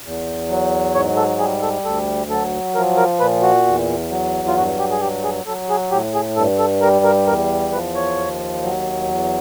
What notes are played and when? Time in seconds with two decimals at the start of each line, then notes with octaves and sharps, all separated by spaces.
0.04 E2
0.49 F#3
0.94 G#2 C#5
1.17 A4
1.39 G3 G#4
1.62 A4
1.84 D2 A4
2.30 F#3 A4
2.75 F3 A#4
2.97 A#4
3.20 A#2 B4
3.42 F#4
3.66 E2
4.10 F#3
4.48 F4
4.56 G2 F#4
4.78 G4
4.91 G#4
5.01 F#3 G4
5.24 G#4
5.46 F#3 A4
5.69 G#4
5.91 A2 G4
6.14 G#4
6.36 G2 A4
6.59 A4
6.81 G3 A#4
7.05 A#4
7.27 E2 A#4
7.72 F3 B4
7.95 C#5
8.18 D#2
8.63 F#3
9.08 E2